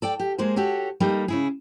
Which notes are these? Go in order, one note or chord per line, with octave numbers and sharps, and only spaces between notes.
A4 D5 G5
G4
G#3 A#3 G#4 C5
F#4 G4 A4 C#5
G3 A#3 D#4 A4 D#5
C#3 E4 G#4